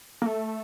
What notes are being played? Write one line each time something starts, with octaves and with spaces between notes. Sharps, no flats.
A#3
A3